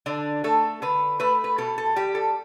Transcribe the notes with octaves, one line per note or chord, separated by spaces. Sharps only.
D3 D4
A3 A4
D3 B4
A3 B4
B4
B2 A4
A4
G3 G4
A4